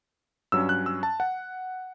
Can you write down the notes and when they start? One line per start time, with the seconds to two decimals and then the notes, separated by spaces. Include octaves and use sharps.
0.52 G2 F#3 C#4 E6
0.69 F#6
0.86 E6
1.03 A5
1.20 F#5